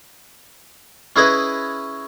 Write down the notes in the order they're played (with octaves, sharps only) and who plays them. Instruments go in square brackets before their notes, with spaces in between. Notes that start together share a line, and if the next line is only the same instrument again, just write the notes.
[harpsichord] C#4 E4 G#4 B4 D#5 B5